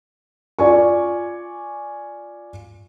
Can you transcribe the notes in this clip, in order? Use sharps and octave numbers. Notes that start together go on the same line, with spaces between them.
F4 D5 G#5 C#6